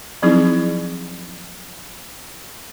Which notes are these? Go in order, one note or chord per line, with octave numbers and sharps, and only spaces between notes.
F3 F#3 C4 D#4 E4 G#4